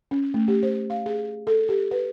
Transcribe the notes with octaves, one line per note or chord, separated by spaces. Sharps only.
C#4
A3
G4
C5
F5
G#4
A4
G4
B4